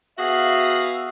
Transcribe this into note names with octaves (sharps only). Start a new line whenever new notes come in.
B3 F#4 G#4 E5 F5